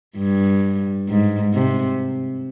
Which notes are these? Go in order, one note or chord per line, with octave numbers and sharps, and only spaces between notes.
G2
G#2
C3